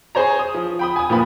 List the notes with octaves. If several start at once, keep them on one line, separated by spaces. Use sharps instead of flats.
G#4 C5 C#5 A#5
D#6
F3
G5 B5 D#6
G#5 D#6
A#2 F3 B3 B5